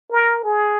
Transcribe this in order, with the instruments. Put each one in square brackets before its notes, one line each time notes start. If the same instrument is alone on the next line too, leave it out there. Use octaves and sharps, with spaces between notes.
[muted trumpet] A#4
G#4